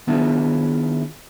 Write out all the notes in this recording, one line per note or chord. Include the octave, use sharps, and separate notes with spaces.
D#3 B3 D4 E4 F4 G#4